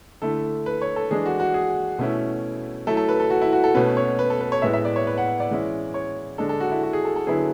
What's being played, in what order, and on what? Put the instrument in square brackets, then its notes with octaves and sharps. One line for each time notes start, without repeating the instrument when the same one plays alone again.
[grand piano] D3 A3 E4 A4
B4
C#5
A4
E3 G#3 D4 G#4
F#4
F#4
G#4
B2 A3 C#4 E4
F#3 A3 E4 A4
A4
B4
A4
F#4
E4
F#4
A4
B2 A3 C#4 B4
C#5
B4
A4
B4
C#5
A2 G#3 B3 E4 E5
E5
D5
C#5
B4
F#5
D5
E3 G#3 C#4 E4
C#5
D3 G#3 D4 A4
A4
F#4
E4
F#4
G#4
A4
A4
D3 F#3 B3 E4 G#4